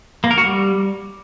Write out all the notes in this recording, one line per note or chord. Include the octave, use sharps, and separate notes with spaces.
A#3
A#4
F#4
G3